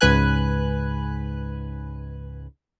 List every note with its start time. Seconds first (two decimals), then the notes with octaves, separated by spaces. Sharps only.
0.01 C#2 G#2 B4 G#5 F#6